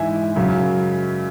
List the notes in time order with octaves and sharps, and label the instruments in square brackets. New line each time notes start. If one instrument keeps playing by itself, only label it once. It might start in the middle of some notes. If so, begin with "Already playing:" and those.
Already playing: [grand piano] G#2 E3 E5 G#5
F#2 C#3 F#3